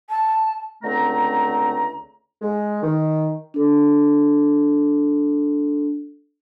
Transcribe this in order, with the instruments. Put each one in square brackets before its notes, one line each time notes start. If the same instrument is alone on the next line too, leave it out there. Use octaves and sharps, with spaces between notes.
[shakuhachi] A5
[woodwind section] C#2 D3 A3 C4 A#5
G#3
D#3
[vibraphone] D4 A4